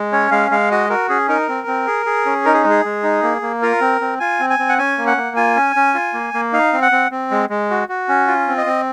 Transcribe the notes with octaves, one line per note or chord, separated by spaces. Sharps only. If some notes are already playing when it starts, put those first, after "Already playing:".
Already playing: G#3
C#4 C#5
G#3 F5
G#3 F5
F#4 D#5
F#4 A#4
C#4 G#4
D#4 A#4
C4
C4
G#4
G#4
C#4
D#4 A#4
G#4
G#3
G#4
G#3
D#4
A#3
A#3
F4 A#4
C4
C4
F4 G#5
C4
G#5
C4
F#5
C#4 G#5
A#3
F#5
A#3
F4 G#5
C#4
C#4
F4
A#3
A#3
D#4 F5
C4
F#5
C4
C4
G#3
G#3
F#4
F#4
C#4
F4
C4
D#5
C4